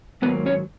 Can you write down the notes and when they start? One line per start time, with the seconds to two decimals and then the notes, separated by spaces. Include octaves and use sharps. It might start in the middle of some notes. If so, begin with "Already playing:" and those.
0.22 G#2 D#3 F#3 A#3 B3 B4
0.46 C#4 C#5